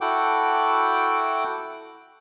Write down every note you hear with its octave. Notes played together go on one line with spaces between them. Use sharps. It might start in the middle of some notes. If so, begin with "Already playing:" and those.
E4 F#4 A4 F#5 G5 D6